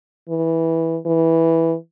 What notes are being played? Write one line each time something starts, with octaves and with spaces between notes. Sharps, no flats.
E3
E3